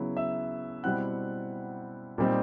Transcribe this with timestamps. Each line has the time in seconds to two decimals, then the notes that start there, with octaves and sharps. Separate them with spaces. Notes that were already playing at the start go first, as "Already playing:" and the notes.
Already playing: C#3 F#3 B3 E4
0.17 E5 E6
0.84 B2 G3 C4 E4 F#5 F#6
2.18 A#2 G3 C4 D#4